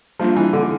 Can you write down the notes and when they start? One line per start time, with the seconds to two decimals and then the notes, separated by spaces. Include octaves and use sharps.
0.20 F3 G3 A#3 D4 F4
0.36 E3
0.53 D3